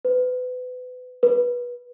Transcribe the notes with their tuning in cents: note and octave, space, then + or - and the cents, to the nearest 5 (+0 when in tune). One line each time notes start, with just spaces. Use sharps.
B4 +30
B4 -20